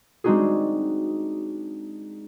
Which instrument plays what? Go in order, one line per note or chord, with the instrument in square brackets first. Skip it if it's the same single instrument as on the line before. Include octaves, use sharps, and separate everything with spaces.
[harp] G#3 C4 D4 D#4 F#4 G#4